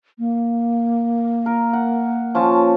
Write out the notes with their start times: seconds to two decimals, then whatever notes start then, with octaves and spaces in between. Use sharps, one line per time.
0.19 A#3
1.46 A#4
1.73 F#5
2.35 F3 C#4 A5